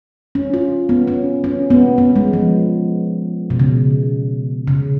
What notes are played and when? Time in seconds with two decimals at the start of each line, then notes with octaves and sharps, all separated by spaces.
0.35 C#4
0.54 F4
0.89 B3
1.08 C#4
1.44 C#4
1.70 B3
1.98 B3
2.16 G#3
2.33 F3
3.50 B2
3.59 C#3
4.68 C#3